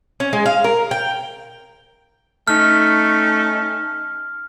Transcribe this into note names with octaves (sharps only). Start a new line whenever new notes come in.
C#4
G#3
F5
A#4
G5
A3 C#4 D#4 F6